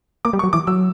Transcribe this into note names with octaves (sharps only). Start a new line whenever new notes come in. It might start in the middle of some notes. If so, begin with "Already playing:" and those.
A#3 D6
G3
C#6
F#3
E3 D6
F#3 E6